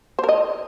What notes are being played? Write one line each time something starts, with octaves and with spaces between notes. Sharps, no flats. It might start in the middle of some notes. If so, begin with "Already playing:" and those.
C5
A#4
D#5